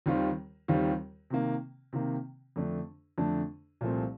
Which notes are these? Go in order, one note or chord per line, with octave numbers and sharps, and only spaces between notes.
D#2 D#3 G3 C4 F4
D#2 D#3 G3 C4 F4
C3 D#3 A#3
C3 D#3 A#3
F2 D3 A3 D4
F2 D3 A3 D4
C2 A#2 F3 A3 C4